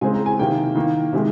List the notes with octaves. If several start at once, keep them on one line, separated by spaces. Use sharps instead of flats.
C#3 G#3 C4 G#5
A#5
G#5
C3 D#3 A#3 G5
D#3 A#3
C3 D#3 G#3